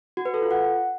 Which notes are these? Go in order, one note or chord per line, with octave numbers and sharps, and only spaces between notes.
F#4
B4
A4
F4
F#5